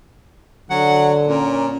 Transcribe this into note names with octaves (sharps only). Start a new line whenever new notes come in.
D3 F#3 F#5
A#2 C#4 A#4